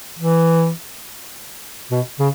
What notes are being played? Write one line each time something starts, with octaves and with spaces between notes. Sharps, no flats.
E3
B2
C#3